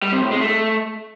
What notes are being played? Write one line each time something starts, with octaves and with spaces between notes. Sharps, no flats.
G3
C3
A2
G#3
A3